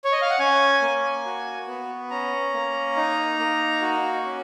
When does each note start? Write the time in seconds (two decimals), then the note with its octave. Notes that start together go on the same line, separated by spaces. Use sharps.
0.05 C#5
0.12 D#5
0.22 F5
0.30 F#5
0.39 C#4 G#5
0.82 A#3
1.26 F#4
1.68 B3
2.10 C#4 A#5
2.54 A#3
2.96 D#4
3.39 A#3
3.81 F#4
4.25 C#4